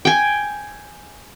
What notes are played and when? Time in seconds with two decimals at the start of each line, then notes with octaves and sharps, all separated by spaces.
0.05 G5 G#5